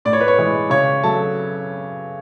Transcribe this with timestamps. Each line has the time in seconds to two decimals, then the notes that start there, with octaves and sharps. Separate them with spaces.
0.05 A2 D5
0.13 C#5
0.21 B4
0.28 C#5
0.38 E3 G#3
0.70 C#3 C#5
1.03 F#3 A3 A5